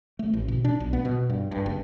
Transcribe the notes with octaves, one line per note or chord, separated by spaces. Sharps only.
A3
A1
B2
D4
B1
B3
B2
G2
G2
F#1